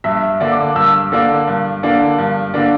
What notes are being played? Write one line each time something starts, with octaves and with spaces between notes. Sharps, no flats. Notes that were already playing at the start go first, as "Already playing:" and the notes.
G2 E5
D3 A#3 D4
D6
G2 E6
D3 A#3 D4
G2
D3 A#3 D4
G2
D3 A#3 D4